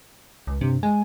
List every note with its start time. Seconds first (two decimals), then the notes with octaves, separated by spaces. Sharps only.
0.47 C#2
0.61 G2 C3
0.83 G#3 G#5